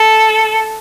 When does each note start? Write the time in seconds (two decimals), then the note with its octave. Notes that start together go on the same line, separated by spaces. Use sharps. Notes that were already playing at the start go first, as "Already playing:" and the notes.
Already playing: A4